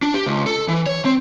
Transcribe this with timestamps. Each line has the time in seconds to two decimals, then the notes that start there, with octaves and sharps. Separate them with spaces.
0.02 D4
0.14 G4
0.26 C#2
0.46 A4
0.68 E3
0.86 C#5
1.05 C4